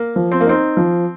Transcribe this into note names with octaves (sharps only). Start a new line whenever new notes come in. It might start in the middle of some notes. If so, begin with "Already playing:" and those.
Already playing: A#3
F3
C4
A#3
C4 D#4
F3